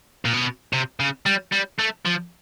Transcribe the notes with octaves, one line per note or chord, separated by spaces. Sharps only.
A#2
B2
C3
C#3
G3
G3
A3
F3